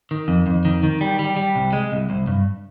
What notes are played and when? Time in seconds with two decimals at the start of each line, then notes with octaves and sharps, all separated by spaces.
0.11 D#3
0.28 F2
0.47 F2
0.65 D#3
0.83 D#3
1.01 G3
1.19 G3
1.37 G3
1.56 C2
1.73 G#3
1.92 C2
2.10 C2
2.27 G2